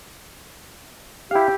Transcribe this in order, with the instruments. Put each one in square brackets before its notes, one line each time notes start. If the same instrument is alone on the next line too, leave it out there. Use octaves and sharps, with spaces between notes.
[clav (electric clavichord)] E4 F5 [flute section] G4